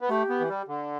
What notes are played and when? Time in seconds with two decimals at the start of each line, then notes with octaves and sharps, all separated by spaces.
0.01 B3
0.09 A3 G4
0.29 B3
0.40 E3
0.49 G3
0.68 D3